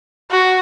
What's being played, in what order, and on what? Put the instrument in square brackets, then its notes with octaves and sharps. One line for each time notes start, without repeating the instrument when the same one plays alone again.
[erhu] F#4